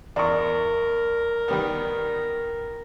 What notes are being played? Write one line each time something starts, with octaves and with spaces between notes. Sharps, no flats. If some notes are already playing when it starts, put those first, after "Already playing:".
E2 A#4 D5 C#6
D#3 G3 B3